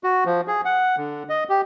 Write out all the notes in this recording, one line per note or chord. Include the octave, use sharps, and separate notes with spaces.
F#4
F3
G#4
F#5
D3
D#5
G4